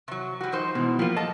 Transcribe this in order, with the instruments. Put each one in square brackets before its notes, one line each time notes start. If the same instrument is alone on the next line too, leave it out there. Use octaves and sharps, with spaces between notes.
[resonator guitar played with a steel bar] C3 F#3
G3 F#4
F3 D#4 C5
[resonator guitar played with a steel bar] G#2 [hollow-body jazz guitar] B2 E3
[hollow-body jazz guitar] F3 A#3 [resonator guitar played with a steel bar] G3 F4
[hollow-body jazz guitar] A4 [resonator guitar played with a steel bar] D#5 A5